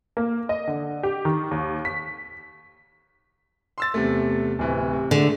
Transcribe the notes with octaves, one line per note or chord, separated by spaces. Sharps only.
A#3
D#5
D3
G4
D#3
D#2
B6
C6 E6 A6
E2 C3 A3
D1 C3 E3
C3
D3 G#3 A3